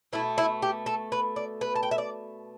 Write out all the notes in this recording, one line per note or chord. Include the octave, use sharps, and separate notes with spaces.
B2 A3 E4
E4
G4
A4
B4
D5
B4
A5
G5
E5
D5